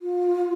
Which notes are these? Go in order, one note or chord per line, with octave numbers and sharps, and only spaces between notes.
F4